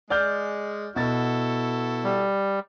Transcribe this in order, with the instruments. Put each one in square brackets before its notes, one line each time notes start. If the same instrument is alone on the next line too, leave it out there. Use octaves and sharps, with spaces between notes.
[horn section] G#3 [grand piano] D5 F6 G6
[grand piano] B2 A6 [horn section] E4 F#4 A4
[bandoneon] G3